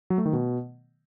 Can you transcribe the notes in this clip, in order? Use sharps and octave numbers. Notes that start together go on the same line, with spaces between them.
F#3
A3
D#3
B2